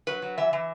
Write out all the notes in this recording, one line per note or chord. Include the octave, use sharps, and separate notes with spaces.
F#3 B4
F#3
E3 E5
E3